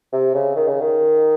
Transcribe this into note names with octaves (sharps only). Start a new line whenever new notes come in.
C3
C#3
D#3
C#3
D#3